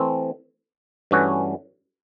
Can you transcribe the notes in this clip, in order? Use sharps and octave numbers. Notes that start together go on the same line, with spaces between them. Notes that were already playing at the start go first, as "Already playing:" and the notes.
Already playing: E3 A3 C4
G2 E3 A3 C#4 F#4